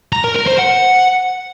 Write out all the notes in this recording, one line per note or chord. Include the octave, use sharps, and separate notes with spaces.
A#5
A#4
A#4
C5
F#5